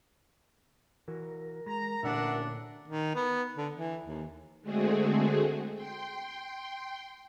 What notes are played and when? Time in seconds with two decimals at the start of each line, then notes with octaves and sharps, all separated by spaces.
1.08 E3 F#4 A#4
1.66 G#3 A#5
2.03 A1 A#2 D3 D4 E5 F#5
2.88 D#3
3.15 B3
3.57 D3
3.75 E3
4.05 D#2
4.62 D3 G#3 A3 C4 F#4 G#4
5.74 G5 C6